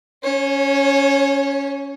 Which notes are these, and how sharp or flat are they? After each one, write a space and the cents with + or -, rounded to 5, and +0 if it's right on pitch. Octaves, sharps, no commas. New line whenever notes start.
C#4 +10 C#5 -25